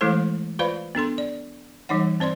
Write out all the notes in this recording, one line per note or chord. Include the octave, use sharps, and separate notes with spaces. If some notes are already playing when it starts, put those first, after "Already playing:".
E3 G#3 A3 E4 A4 C5
F4 B4 C5 D5 F5 B5
B3 D4 A4 C6
D5
E3 G3 D#4 C#5 F#5
C4 C5 D5 C6